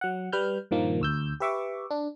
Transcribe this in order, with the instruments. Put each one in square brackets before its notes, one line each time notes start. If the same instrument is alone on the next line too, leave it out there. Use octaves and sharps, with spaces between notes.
[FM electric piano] F#3 F#5
G3 B4 F6 G6
G2 A#2 D#3 F3 A#3
D2 E6 G6
G4 B4 E5 C#6 D6
D4